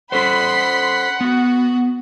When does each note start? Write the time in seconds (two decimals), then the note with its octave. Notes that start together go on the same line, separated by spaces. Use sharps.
0.12 C#4 A4 C5 F#5 B5 C6 B6
1.21 B3 F#4